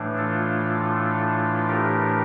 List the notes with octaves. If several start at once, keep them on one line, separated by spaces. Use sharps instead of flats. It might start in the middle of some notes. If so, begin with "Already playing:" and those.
Already playing: A2 E3 A3 D4
F4 A4
G4 A#4